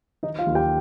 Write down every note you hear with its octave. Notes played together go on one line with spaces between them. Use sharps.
D#3 D#4 D#5
F4 F5
D#2
G4 G5